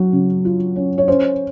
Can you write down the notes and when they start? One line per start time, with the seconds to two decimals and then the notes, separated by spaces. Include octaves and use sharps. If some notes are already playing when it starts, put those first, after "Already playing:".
Already playing: F#3 C#4
0.13 C#3
0.45 F4
0.76 C#4
0.98 C#5
1.08 C#4 C5